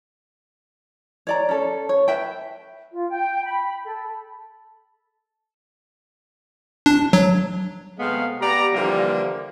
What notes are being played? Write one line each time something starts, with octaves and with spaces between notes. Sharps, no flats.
C#5 D5 A#5
C#4 A4
C#5
B4 E5 G5
F4
G5
B5
A4
D4
F#3
C3 G#3 A3 B3 F5
B3 G4 D5 A#5
D3 E3 F3 G3 A#3